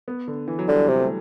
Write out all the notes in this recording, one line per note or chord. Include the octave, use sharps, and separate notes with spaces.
B3
D3
E3
F#3
D3 G3
C3
A3